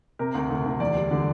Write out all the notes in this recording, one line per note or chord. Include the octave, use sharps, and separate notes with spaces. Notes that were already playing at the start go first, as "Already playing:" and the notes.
C3 A#4
D2
D2
D2
E2 D5
G3
D3